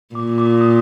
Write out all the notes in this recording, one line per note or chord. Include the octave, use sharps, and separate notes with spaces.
A#2 D6
D6
D#6